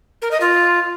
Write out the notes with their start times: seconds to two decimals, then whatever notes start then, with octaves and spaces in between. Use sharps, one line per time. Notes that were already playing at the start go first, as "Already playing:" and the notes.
0.22 A#4
0.31 D#5
0.41 F4